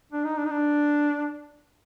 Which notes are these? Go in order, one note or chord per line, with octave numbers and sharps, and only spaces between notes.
D4
D#4
D4
D#4
D4